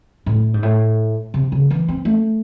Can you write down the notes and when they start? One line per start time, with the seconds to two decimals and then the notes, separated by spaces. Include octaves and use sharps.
0.26 A2
0.54 G#2
0.63 A2
1.34 C3
1.52 C#3
1.70 E3
1.88 C4
2.05 A3